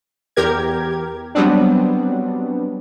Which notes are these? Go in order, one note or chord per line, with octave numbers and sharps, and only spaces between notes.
E2 G4 A#4 G#6
F#3 G3 B3 C4 D4